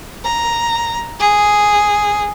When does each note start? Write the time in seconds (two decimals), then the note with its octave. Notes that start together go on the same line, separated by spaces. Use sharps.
0.22 A#5
1.18 G#4